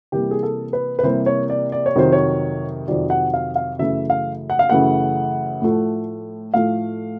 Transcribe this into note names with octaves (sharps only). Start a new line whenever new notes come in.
C3 E3 G3 A#3 G4
G#4
A4
B4
B4
C3 E3 G3 A#3 C5
C#5
D5
D5
C#5
F2 C3 D#3 F#3 C5
C#5
F2 C3 D#3 F#3 D5
F#5
F5
F5
F#2 C#3 E3 A3 E5
F5
F#5
F5
F#2 C#3 E3 A3 F#5
A2 F3 A3
A2 F3 A3 F5